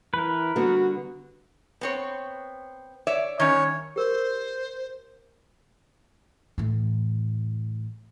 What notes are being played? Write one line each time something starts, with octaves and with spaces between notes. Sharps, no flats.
E3 A#4 B4
D3 G3 B3 F#4
B3 C4 C#5
C#5 D5 E5
D#3 G3 C#4 C#5
G4 A#4 C5
A2 E3